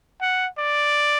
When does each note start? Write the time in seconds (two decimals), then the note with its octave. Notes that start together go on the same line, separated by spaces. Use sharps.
0.21 F#5
0.58 D5